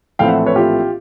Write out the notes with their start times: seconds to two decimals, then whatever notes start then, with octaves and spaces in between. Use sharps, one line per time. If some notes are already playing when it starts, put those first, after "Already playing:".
0.19 A#1 A2 E3 A3 C4 F5 G5
0.28 E5 F#5
0.46 B4 C#5
0.56 F4 G4